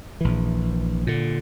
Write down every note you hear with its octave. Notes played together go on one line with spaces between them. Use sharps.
A#1 E3
A#2 D3